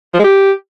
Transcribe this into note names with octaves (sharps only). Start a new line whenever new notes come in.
F3
G#3
G4